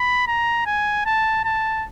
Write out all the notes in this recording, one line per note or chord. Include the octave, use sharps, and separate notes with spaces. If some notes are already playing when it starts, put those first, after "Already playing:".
Already playing: B5
A#5
G#5
A5
A5